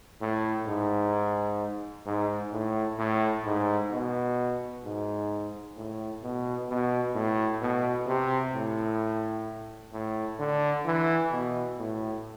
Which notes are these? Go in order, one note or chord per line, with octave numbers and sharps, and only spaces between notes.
A2
G#2
G#2
A2
A2
G#2
B2
G#2
A2
B2
B2
A2
B2
C3
A2
A2
D3
E3
B2
A2